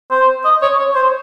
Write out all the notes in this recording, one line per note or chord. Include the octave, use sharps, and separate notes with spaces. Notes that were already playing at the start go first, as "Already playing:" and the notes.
C5
D#5
C#5
C#5
C5